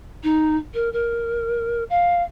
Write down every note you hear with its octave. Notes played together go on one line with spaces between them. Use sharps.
D#4
A#4
A#4
F5